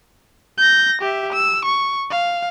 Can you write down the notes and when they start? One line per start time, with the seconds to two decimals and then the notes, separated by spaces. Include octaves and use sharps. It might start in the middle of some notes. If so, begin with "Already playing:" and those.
0.58 G6 A#6
1.02 G4 E5
1.33 E6
1.65 C#6
2.11 F5